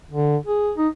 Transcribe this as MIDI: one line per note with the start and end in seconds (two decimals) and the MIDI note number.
0.11 0.37 50
0.46 0.71 68
0.77 0.87 63